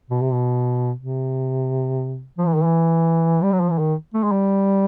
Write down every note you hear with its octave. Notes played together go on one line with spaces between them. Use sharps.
B2
C3
B2
C3
F3
E3
D#3
E3
G3
F#3
F3
E3
D#3
A3
G#3
G3